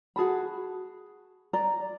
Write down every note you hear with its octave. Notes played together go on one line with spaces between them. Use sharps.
F#4 G#4 A5 B5
D5 A#5